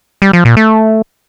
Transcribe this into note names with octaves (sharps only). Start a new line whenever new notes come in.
G3
F3
A#2
A3